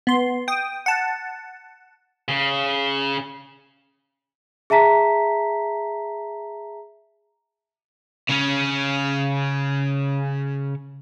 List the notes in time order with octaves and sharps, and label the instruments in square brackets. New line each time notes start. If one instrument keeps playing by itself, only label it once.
[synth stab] B3 C6
G5 D#6
F#5 A5
[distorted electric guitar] C#3
[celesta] G#4 E5 A5 A#5 B6
[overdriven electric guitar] C#3 C#4